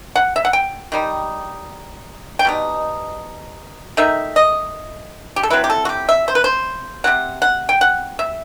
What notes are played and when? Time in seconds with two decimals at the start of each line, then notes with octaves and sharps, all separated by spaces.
0.16 F#5
0.36 E5
0.45 F#5
0.53 G5
0.92 D#3 G3 D#4
2.39 G5
2.45 B2 G3 D#4
3.97 D#3 A3 D#4 E5
4.36 D#5
5.36 G4
5.43 A4
5.50 F#3 C4 E4 B4
5.64 G4
5.70 A4
5.85 F#4
5.89 G4
6.09 E5
6.28 C5
6.35 B4
6.44 C5
7.04 C3 F#3 C4 F#5
7.42 F#5
7.69 G5
7.81 F#5
8.19 E5